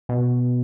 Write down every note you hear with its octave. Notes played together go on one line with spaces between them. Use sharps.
B2